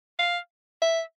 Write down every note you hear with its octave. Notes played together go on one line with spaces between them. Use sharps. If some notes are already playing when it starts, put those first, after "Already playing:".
F5
E5